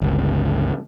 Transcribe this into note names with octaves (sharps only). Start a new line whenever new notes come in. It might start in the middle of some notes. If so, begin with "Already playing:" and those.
G1 C#2